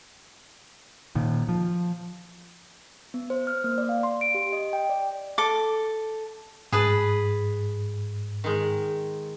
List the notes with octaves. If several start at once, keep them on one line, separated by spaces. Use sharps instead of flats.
A#2 D#3
F3
B3
C5
F6
A#3
D5
F5
C6
D7
G4
D#5
G5
D5
A4 D6
G#2 G#4 B4 A5
D#3 G#3